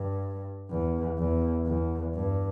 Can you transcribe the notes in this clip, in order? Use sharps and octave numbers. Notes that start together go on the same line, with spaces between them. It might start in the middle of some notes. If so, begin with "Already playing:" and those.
Already playing: G2
E2
E2
E2
G2